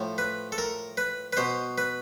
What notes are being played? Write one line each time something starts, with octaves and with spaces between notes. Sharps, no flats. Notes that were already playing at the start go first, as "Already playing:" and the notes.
Already playing: A2 F3
B4
A4
A#4
B4
B4
B2 C5
B4